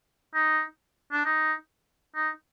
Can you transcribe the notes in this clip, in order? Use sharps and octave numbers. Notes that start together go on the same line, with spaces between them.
D#4
D4
D#4
D#4